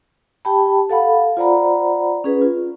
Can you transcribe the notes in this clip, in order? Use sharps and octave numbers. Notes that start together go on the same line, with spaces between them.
G4 G5 A5 B5
A4 F5 F#5 B5
F4 C5 D5 F#5 A#5 B5
C#4 G#4 B4
F4